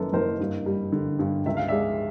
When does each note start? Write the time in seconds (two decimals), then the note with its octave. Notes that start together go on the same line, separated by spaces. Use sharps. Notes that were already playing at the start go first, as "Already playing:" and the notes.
Already playing: F#1 F#2 D#3 A4 B4
0.13 F#1 A#4 C5
0.40 G2
0.66 G3
0.92 D3
1.19 G2
1.46 C#2 E5
1.57 F5
1.68 G#3 D5 E5